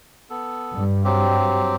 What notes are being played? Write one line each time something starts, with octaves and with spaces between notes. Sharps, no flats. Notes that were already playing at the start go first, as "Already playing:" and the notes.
B3 A4
G2
F#3 C4 G4